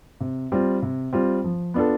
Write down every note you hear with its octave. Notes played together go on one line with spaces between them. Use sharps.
C3
G3 C4 F4
C3
G3 C4 F4
F3
B3 D4 F4 A4